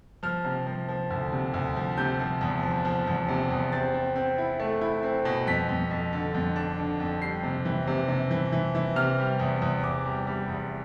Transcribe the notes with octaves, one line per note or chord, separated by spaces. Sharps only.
F3 F6
C3
F3
F3
D2
C3
D2
F3
C3 G6
F3
E2
F3
F3
E2
C3
E2
C4 A6
C4
C4
E4
A3
E4
C4
B2
F2 B6
F2
F2
D3
F2
D4
D3
F2
G3 C7
C3
E3
C3
C3
E3
E3
E3
C3 F6
G3
E2
E2
E2 D6
G3
G3
E2